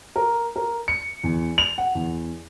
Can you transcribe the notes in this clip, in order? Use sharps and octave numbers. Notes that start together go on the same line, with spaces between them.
A#4
A#4
C#7
E2
F7
F#5
E2